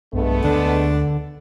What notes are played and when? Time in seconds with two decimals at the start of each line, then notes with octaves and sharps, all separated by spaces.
0.13 B1 G2 G#3 A3 B3
0.44 D2 D3 D4